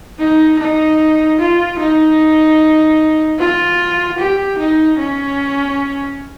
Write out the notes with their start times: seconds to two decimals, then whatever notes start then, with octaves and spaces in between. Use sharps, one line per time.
0.19 D#4
0.59 D#4
1.39 F4
1.80 D#4
3.39 F4
4.19 G4
4.59 D#4
4.99 C#4